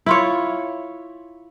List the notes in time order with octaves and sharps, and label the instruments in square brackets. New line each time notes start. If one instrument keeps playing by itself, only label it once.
[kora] E4 F4 C#5